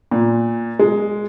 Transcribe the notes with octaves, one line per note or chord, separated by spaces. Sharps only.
A#2
G#3